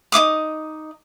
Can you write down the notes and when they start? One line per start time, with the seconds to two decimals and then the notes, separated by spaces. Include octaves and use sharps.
0.12 D#4 E4 D6 D#6